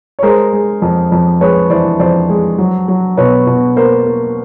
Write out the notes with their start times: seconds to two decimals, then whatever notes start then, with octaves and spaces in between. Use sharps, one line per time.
0.19 C#5
0.23 G#3 A#4 C5
0.53 G#3
0.82 F2
1.12 F2
1.41 G#3 B4 C#5
1.70 E3 C5 D5
1.99 F2 C5 D5
2.29 G#3
2.58 F#3
2.88 F#3
3.17 B2 B4 C#5
3.47 B2
3.76 A#3 A#4 C5
4.06 A#3